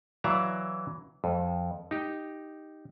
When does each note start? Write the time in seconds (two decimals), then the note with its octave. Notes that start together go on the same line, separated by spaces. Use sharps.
0.24 E3 F#3 D5 E5 F5 A#5
1.24 F2
1.91 D#4 G4